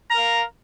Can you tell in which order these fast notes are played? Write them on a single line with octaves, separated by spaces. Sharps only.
A#5 A#4 F5